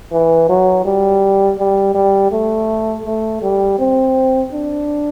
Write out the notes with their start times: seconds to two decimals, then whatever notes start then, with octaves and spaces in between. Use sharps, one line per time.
0.11 E3
0.49 F#3
0.85 G3
1.59 G3
1.95 G3
2.31 A3
3.06 A3
3.42 G3
3.78 C4
4.53 D4